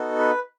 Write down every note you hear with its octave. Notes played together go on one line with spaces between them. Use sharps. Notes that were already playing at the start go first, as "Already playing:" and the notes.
Already playing: B3 D#4 F#4 A4
B4